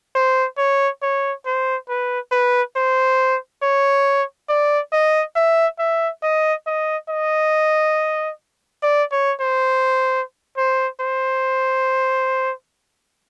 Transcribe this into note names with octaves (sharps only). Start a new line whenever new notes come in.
C5
C#5
C#5
C5
B4
B4
C5
C#5
D5
D#5
E5
E5
D#5
D#5
D#5
D5
C#5
C5
C5
C5